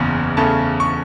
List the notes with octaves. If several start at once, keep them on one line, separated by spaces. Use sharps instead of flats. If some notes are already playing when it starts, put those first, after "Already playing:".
Already playing: F#1 E2 C#3 C#4
E2 C#3 A3 C#4 A5
C#6